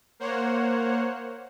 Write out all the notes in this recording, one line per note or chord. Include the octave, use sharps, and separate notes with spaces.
A#3 C5 C#5 F#5